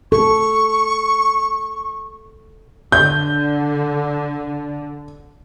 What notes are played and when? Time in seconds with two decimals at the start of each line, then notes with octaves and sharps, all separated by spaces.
0.12 A4 C#6
2.92 D3 G6